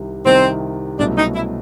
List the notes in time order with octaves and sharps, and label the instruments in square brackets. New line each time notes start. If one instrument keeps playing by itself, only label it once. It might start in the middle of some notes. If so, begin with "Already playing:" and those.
Already playing: [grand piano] C2 C3 D#3
[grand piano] C2 C3 D#3 [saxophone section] C4
[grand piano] C2 B2 F#3 A3 C#4 [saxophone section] D4
[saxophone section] D#4
E4